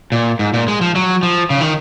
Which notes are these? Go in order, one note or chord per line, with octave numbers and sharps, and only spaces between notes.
A#2
G#2
A#2
G#3
F3
F#3
F3
C#3
D#3